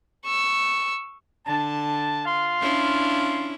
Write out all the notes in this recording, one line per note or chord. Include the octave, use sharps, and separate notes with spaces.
C#6 E6
D3 A5
F4 F5 C6
C#4 D4 E4